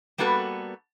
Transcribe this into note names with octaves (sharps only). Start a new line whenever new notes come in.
G3 A#3 B3 F#4 A4 B4